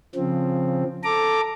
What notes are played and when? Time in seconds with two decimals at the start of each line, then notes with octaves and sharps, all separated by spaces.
0.15 C#3 F3 C4
1.04 A4 A#5 D6